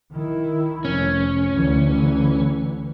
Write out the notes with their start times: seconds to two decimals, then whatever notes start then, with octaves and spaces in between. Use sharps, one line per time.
0.12 D#3 E4
0.85 F1 C#4
1.54 D2 E3